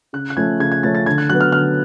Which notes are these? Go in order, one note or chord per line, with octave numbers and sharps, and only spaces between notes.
C#3 F#6
F#6
F3 A3 C#4 G#6
C#3 G#6
G#6
F3 A3 C#4 A6
A6
D3 G#6
F#6
F#3 B3 F#6
F6
D3 F6